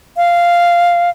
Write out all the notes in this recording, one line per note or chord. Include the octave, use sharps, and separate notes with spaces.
F5